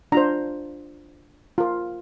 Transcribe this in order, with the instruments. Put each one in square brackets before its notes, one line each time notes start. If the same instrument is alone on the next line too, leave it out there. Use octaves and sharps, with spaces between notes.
[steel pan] D4 F4 C5 A#5
F4 A#4